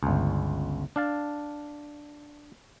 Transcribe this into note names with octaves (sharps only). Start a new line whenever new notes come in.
G1 C#2
D4 F5 A5